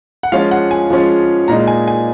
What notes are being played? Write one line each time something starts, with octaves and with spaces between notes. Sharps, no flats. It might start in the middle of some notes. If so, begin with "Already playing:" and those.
F#5
F3 G#3 C#4 F4 F5
F#5
G#5
F3 G#3 C#4 F4
A#2 G#3 D#4 A#5
G#5
G#5